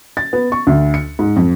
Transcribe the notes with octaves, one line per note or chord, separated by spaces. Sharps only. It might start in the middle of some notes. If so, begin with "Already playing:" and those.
A6
B3
C#6
D2
C#7
G#2
F2